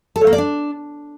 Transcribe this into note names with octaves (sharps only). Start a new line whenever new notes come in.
A4
C#5
A#3
D5
D4